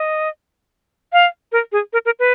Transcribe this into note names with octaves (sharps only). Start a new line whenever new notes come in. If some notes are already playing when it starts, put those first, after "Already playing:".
Already playing: D#5
F5
A#4
G#4
A#4
A#4
B4